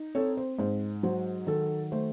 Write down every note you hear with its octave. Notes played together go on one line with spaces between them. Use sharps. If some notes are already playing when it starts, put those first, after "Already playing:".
Already playing: D#4
C4 A4 C#5
C5
G#2 C5
F#3 C5
D#3 A4
A3 C5